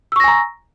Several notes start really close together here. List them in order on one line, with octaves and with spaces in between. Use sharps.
E6 C#6 A#6 G#5 A#5